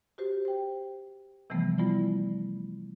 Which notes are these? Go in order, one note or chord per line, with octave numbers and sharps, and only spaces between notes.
F#4 G4 C5
C5 G5
C3 E3 F3 G3 A3 B3
G3 A3 B3 E4 F4 D5